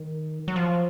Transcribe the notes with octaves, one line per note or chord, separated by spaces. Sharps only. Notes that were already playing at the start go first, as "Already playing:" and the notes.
Already playing: D#3
F#3
F3